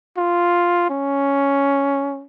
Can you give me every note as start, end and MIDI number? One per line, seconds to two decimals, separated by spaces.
0.18 0.86 65
0.90 2.26 61